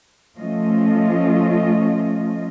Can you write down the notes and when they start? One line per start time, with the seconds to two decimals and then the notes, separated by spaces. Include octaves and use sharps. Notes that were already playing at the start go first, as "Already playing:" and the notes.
0.37 F3 A3 C#4 F4 D#5